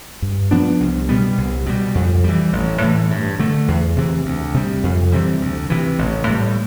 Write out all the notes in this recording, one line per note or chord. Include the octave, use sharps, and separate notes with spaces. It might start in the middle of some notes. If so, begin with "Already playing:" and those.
G2
F3 B3 D4
C2
B2 G3 B3
C2
B2 G3
F2
E3 G3
A1
A2 E3
G2
D3 A3
E2
C3 E3
D2
C3 G3
F2
C3 E3 G3
D2
C3 E3
A1
A2 G3